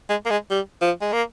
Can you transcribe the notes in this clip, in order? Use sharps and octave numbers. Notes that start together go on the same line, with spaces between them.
G#3
A#3
G#3
G3
F3
G#3
A#3